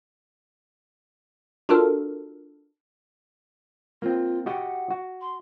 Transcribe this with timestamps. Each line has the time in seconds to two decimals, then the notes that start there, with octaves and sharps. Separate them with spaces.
1.69 D4 F4 F#4 A4 A#4
4.02 A#3 C4 F4
4.46 F#4 G4 D#5 F#5
4.91 F#4
5.21 C6